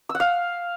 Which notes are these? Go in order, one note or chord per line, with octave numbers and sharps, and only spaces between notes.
E6
F#5
F5